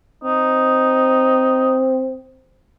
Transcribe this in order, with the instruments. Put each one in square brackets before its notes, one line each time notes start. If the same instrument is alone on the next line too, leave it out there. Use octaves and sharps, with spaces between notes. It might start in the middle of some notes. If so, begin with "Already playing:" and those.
[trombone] C4 [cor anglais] D#4